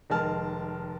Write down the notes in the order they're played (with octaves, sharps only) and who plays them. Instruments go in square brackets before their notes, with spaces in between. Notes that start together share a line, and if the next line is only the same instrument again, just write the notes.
[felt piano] F1 D#3 G#3 A#4 A5 F6